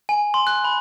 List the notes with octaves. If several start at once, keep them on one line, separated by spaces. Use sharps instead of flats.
G#5
C6
F#6
B5